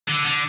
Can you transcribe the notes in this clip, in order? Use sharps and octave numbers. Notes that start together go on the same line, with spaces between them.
D3
D3